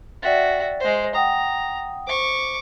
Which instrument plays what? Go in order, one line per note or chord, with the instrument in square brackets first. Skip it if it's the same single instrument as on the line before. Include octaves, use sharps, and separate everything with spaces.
[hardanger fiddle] F#4 E5 [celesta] D5 G5 A6
[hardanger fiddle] G#3 C5
[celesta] F#5 G5 D#6 [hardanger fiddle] A#5
[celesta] C5 [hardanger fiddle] C#6 D6